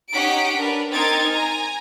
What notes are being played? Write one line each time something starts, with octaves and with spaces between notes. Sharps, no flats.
C#4 D#4 G4 F#5 B6 D7
D4 A#4 B4
C4 D#4 A#4 G5 G#6 A6
G#5 A#5